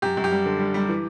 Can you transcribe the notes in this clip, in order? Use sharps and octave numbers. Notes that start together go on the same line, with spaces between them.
F#2 G4
F#2
G4
G3
D3
G3
G3
E3